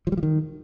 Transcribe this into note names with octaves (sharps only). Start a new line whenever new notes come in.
F3
G3
F3
D#3